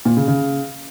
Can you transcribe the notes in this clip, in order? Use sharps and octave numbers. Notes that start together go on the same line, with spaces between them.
A#2
C#3
C#3